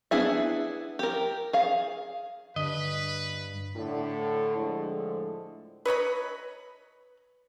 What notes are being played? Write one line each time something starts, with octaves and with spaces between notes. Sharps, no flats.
B3 D4 E4 G#4 E5
G4 A#4
G#4 F5
G2 D3 B4 D#5
A2 D3
A2 D3 F3 G#3
B4 C#5 D#5 B5